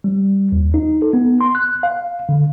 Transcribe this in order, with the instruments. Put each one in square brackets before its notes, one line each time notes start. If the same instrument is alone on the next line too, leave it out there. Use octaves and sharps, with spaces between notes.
[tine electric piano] G3
D#2
D#4
A4
B3
C6
F#6
F5
D3